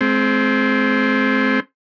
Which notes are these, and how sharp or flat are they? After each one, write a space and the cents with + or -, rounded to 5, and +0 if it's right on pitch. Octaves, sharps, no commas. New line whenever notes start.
G#3 +40 C4 +0